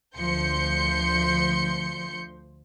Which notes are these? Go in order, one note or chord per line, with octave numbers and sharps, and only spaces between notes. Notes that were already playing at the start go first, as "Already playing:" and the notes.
D2 F3 C6 G6 C#7